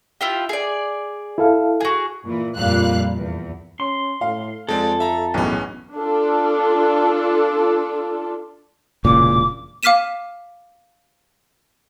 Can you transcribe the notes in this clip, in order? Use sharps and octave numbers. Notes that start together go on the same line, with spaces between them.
E4 F4 G4
G#4 D5
E4 A4 F5
F#4 G#4
A#2 E3
F2 A#2 G3 F5 F#6
E2
C#4 C6
A2 F5
F2 G#3 C4 A4 D5
E5 A#5
B1 E2 A2 B3 C#4
D4 F4 A4
E1 A#2 C#3 D6
F5 D6 F6 B6 D#7 E7